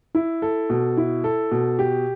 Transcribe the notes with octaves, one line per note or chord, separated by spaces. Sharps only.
E4
A4
B2
E4
A4
B2
G4